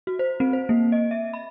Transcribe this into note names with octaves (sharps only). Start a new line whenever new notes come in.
F#4
C5
C4
C5
A#3
D#5
E5
B5